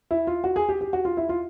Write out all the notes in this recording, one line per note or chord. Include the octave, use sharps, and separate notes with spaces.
E4
F4
F#4
G#4
G4
G4
F#4
F4
E4
F4